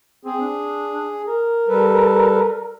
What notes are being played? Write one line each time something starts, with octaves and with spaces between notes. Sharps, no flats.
C4 G#4
D4
A#4
G3 A4 B4